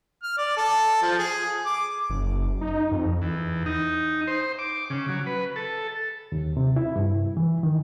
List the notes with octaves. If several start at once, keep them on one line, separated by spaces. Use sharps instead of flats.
F6
D5
A4
F3
G#4
D6
F#1
D#4
F2
E2
D#4
C5
D6
C#3
F#3
B4
A4
D#2
C3
E4
G2
E3
D#3